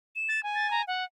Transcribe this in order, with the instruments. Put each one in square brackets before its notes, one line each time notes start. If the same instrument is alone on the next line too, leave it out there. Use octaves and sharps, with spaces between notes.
[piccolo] E7
[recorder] A6
G#5
[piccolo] A6
A#5
F#5